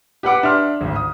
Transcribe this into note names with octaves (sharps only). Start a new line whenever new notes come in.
G4 B4 F#5 D6
D4 E5 C6 F6
G#1 D2
D#6